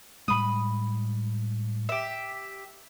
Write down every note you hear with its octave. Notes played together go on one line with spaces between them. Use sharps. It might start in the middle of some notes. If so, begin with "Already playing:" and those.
A2 G3 G#3 B5 D#6
G4 E5